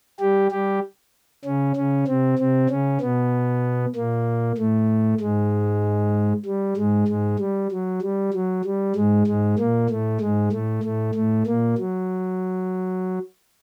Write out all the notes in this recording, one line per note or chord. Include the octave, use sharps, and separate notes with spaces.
G3 G4
G3 G4
C#3 C#4
C#3 C#4
C3 C4
C3 C4
C#3 C#4
B2 B3
A#2 A#3
A2 A3
G#2 G#3
G3
G#2 G#3
G#2 G#3
G3
F#3
G3
F#3
G3
G#2 G#3
G#2 G#3
A#2 A#3
A2 A3
G#2 G#3
A2 A3
A2 A3
A2 A3
A#2 A#3
F#3